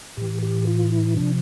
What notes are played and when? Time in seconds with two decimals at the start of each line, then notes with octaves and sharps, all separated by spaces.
0.17 A2 E3 G4
0.43 G4
0.67 F4
0.92 E4
1.17 C3 F3 D4